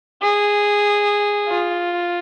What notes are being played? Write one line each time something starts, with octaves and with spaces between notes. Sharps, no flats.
G#4
F4